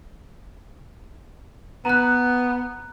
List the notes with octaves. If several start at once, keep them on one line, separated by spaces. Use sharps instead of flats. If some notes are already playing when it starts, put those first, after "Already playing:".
B3 A#5 F#6